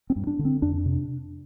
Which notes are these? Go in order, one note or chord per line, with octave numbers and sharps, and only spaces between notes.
C4
G2
D4
D3
C4
F2 D4
D4
C3